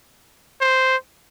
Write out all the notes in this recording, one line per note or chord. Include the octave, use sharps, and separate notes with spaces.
C5